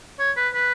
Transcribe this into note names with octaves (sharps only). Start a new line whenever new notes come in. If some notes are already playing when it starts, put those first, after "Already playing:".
C#5
B4
B4